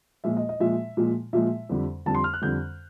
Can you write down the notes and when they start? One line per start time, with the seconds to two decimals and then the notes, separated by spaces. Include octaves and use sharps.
0.24 A#2 F3 G#3 E5
0.37 D#5
0.49 D#5
0.60 A#2 F3 G#3 E5
0.97 A#2 F3 G#3
1.33 A#2 F3 G#3 E5
1.69 F2 D3 G3
2.06 F2 D3 G3 A5
2.15 C6
2.24 F6
2.34 F#6
2.41 F2 D3 G3 G6